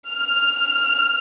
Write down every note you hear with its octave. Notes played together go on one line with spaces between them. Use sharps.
F6